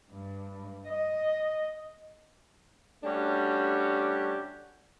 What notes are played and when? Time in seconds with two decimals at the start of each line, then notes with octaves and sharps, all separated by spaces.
0.11 G2
0.88 D#5
3.04 G3 A3 C#4 D4 F#4 G4